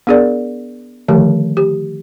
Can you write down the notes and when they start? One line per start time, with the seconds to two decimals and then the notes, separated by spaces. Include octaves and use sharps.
0.07 B3 D4 G#4 A#4 D5
1.08 D3 D#3 F3 A3 G4
1.57 G4